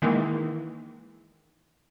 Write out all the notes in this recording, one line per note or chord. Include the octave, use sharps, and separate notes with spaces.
D#3 E3 G#3 A#3